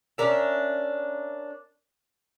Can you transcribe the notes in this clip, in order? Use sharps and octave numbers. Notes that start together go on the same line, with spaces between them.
C#4 D4 A#4 E5